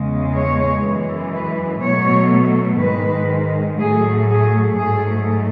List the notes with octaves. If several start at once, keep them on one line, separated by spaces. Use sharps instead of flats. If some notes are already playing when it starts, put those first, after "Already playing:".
Already playing: E2 C#3 G#3
C#5
F#2 E3 G#3
B4
B2 F#3 A3 C#5
G#2 D#3 G#3 B4
A2 F#3 A3 G#4
G#4
G#2 F#3 A3 G#4